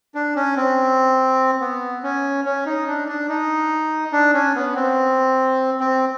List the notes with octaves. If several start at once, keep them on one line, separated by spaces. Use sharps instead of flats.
D4
C#4
C4
B3
C#4
C#4
D#4
D4
D4
D#4
D4
C#4
B3
C4
C4